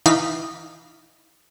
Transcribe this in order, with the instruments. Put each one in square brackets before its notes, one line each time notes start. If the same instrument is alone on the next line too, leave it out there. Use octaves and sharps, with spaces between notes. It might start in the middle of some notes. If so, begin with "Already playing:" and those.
[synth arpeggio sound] E3 D#4 F5 B6